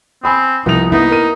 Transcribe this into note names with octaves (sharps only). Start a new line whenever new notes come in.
C4 G#5 B5 D#6
C2 F3 B3 D#4 F7
A#3 B3 D#4 E4
A#4 D#7